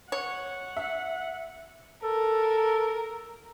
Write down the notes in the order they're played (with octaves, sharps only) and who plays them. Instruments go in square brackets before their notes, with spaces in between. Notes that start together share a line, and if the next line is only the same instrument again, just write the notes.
[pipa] C#5 [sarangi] F#5
[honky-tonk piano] E5
[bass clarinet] A4 [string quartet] A#4